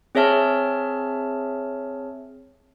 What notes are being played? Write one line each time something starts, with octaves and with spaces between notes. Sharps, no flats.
C4 G#4 C#5 E5 A5 F6